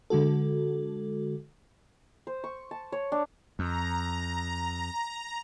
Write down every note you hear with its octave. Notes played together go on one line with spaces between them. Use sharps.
D3 G#3 F#4 A4
C5
C#6
A5
C#5
D4
F2 A#5